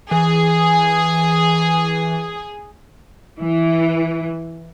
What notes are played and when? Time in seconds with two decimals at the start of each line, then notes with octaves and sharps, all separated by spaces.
0.11 E3 G#4
3.38 E3